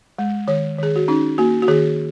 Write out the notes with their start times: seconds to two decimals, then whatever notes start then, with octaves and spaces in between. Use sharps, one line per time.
0.19 G#3
0.48 D#3 C#5
0.78 D#3 G#4
0.96 F#4
1.08 C#4 D#4
1.38 A#3 F#4
1.62 F#4
1.68 D#3 G#4